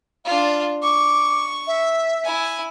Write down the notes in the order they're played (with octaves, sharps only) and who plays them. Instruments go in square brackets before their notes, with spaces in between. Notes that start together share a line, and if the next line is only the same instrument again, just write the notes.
[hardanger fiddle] D4 F4 [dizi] F5
[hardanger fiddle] C#6 [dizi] D6
[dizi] E5
[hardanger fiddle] E4 G#5